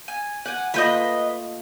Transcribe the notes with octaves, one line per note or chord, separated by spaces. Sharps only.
G#5
F#5 G#5 D6
A3 A#3 F4 B4 C5 D#5